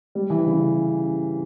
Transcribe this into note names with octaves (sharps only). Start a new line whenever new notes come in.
G3
E3
C#3